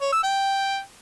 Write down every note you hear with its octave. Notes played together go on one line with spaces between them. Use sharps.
C#5
E6
G5